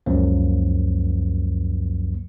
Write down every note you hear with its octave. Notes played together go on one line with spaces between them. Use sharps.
C#2 F#2 F3 F#3 A#3